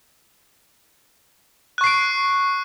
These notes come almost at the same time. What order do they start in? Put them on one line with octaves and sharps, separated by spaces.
F#6 C#6 C7 D7